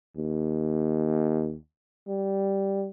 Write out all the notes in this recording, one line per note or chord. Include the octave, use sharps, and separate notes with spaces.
D#2
G3